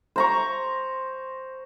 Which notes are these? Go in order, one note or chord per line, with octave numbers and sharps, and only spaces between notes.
C5 A#5 C#6